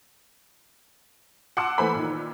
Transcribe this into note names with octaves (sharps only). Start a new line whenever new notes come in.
F#5 A5 C6 D6 E6 F#6
E3 A3 B4 C5 G#5 B5
A#2 D#3